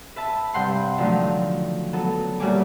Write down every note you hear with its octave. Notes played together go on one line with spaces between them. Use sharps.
B4 E5 A5 B5
G2 C3 F#5 G5 C6
D3 D#3 F3 F#3 A3
F#3 B3 A4
D2 A#2 G3 C#5 G#5 D6